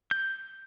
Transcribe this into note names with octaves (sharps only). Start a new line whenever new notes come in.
G6